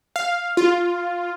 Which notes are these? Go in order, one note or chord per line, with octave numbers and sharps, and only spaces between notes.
F5
F4